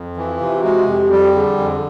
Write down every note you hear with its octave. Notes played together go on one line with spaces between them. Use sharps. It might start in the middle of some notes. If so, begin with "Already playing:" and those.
Already playing: F2
E3
F4
C3
F#4
G#3
F2 G4
G3
D3 G#4
F2